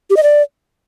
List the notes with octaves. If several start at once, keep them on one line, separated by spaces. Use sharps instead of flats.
G4
D#5
D5